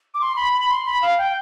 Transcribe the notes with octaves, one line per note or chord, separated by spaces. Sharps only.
D6
C6
B5
B5
C6
B5
F5
G5